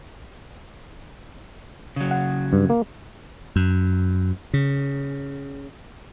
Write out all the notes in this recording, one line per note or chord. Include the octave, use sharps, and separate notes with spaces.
C#3 F#3
F#5
G2
A#3
F#2
C#3